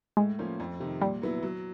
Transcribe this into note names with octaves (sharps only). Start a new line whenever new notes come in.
A2 G#3
F3 A#3 C#4
F2
C3 D#3
A#2 G3
F#3 B3 E4
F#3